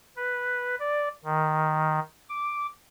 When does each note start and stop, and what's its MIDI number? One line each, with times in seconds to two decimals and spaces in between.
0.17 0.75 71
0.80 1.08 74
1.25 1.99 51
2.30 2.67 86